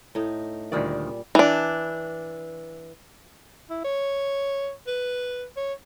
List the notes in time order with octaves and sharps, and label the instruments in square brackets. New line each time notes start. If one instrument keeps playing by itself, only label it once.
[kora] A2 D#4
[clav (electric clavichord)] D2 D#3 [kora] A#2 G3 D5
[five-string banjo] E3 D4
[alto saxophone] E4
C#5
B4
C#5